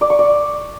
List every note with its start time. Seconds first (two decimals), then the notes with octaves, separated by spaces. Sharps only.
0.01 D5
0.10 C#6
0.19 D5